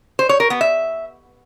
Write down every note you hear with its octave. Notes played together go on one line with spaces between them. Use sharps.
C5
C#5
A#4
B3
E5